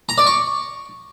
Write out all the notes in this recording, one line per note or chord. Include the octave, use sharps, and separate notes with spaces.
A#5
D5
C#6